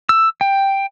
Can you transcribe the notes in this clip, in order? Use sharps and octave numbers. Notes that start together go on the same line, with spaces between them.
E6
G5